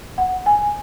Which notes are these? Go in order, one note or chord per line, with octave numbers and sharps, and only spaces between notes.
F#5
G#5